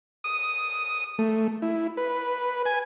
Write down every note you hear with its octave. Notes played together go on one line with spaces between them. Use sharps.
D#6
A3
E4
B4
G#5